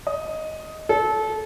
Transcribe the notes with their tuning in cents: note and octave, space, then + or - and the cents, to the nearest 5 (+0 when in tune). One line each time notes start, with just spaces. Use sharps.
D#5 +10
A4 -25